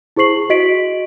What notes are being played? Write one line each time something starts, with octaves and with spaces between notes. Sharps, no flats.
E4 G#4 C5 C#6 C7 F#7
F#4 D#5 B6 D7 F#7